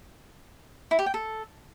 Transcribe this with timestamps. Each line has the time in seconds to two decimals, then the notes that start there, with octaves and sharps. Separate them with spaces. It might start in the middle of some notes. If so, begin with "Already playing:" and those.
0.91 E4
0.99 G4
1.06 G5
1.14 A4